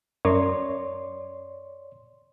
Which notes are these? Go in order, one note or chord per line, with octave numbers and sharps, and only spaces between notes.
F#2 C#5 D5 C6